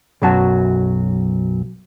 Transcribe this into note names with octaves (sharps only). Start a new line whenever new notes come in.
B1 F#2 F#3 F#4 A5